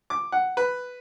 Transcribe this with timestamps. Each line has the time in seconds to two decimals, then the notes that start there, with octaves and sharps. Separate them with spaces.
0.10 D6
0.32 F#5
0.57 B4